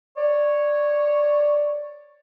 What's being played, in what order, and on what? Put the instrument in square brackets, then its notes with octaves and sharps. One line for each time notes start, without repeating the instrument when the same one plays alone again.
[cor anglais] C#5 [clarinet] D5